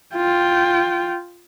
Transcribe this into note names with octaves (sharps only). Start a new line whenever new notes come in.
F4 G5